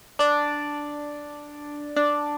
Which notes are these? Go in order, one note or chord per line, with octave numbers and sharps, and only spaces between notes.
D4 D5
D4 D5